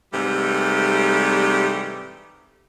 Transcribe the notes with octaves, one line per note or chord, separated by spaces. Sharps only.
G#2 C3 E3 G3 A3